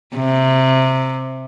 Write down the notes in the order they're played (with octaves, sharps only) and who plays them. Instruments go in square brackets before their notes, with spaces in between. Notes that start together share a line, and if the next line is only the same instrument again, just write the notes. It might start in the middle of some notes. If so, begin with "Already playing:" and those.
[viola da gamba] C3